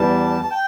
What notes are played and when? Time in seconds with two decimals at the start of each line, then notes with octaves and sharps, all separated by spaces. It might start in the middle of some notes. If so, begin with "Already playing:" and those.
Already playing: E2 E3 G3 A5
0.42 A5
0.51 G5